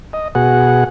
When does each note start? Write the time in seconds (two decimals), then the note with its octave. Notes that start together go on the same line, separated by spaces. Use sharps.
0.13 D#5
0.35 B2 F#4 G#4 F#5